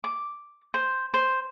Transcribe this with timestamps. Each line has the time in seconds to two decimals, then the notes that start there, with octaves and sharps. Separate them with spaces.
0.04 D6
0.74 C5
1.14 C5